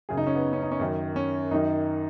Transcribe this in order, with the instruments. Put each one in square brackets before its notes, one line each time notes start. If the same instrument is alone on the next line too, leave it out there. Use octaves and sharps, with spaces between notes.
[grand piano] F#2 C#3 G#4
D#4
C#4
B3
C#4
D#4
C#4
F#2 D#3
C#4
F#2 D#3 D#4